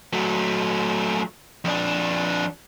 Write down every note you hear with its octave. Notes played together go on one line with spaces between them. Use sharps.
F#3 A3
F2 D4